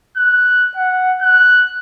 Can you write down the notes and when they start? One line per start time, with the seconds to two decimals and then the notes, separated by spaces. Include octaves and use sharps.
0.17 F#6
0.77 F#5
1.22 F#6